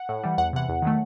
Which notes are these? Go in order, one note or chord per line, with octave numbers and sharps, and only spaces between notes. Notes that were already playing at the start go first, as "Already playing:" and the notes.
Already playing: F#5
A2
E3 G3
E2 F#5
C3 E3 F#5
E2
D#3 F#3 A3